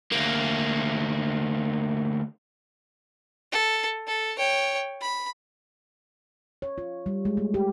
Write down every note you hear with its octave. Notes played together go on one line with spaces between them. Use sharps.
D2 A#3
A4
A4
C#5 G5
B5
C#5
F4
G3
G#3
A3
G4